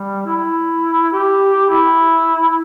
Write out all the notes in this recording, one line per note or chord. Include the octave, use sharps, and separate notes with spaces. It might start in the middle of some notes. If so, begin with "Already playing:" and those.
Already playing: G3
E4
G4
E4